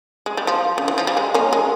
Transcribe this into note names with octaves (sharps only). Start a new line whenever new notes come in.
G#3
G3
F3
C#3
E3
F3
G3
G#3
A#3 C#4
G#3